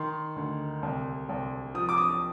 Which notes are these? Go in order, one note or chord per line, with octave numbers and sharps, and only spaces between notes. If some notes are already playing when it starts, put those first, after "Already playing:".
Already playing: D#3 C6
D2
C2
C2
F3 D#6
D6
D#6